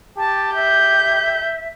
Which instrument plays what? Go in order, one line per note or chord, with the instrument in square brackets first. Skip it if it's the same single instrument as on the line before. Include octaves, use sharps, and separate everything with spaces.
[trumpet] G4 [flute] A5
[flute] E5 [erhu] G6